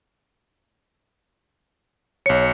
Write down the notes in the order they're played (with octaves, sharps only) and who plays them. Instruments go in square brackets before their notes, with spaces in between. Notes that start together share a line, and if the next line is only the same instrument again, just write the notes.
[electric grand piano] B1 C#7 [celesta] C#5